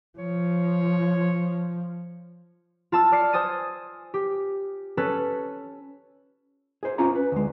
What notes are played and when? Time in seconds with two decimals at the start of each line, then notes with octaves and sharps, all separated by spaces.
0.18 F3 C#5
2.92 F4 A5 E6
3.12 D5 F6 C7 C#7
3.33 C5 G#5 D#6 A6 D#7
4.14 G4
4.97 C#4 A4 B4
6.83 G#4 C5
6.98 C#4 F4 C#5 A#5
7.15 B4
7.32 D2 G#3